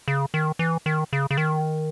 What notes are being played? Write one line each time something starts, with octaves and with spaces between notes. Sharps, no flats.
C#3
D#3
E3
D#3
C#3
C#3
D#3